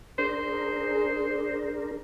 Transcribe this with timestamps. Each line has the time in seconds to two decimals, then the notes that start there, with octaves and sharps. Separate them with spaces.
0.19 D4 G#4 A#4 C5